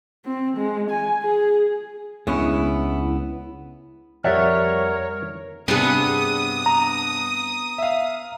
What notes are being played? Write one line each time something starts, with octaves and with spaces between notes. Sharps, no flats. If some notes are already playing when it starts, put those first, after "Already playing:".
C4
G#3
G#5
G#4
C#2 G#3 B3 C#4 D4 E4
F2 G3 A#4 C#5 D5 E5 F#5
G2 C3 B3 D4 G#4 D#6
A#5
E5 F5